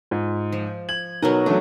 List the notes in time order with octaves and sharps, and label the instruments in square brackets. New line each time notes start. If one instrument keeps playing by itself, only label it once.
[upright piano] G#2 [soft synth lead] F4
[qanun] F3
[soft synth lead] G#6 [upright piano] F#7
[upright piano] B2 A#4 [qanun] F#3 B3 D#5 [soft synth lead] D#4
[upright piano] F#3 A3 [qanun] D4